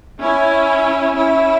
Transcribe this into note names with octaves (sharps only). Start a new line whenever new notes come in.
C#4 E4
C#4 E4